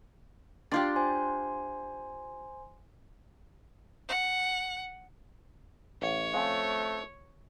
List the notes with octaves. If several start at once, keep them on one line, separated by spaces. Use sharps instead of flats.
D4 F4 G4 C6 D6 A6
C5 G#5 C6
F#5
A1 C#5
F3 A3 C4 C#4